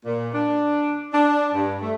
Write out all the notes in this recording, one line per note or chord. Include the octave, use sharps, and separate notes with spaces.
A#2
D4
D4
G2
A3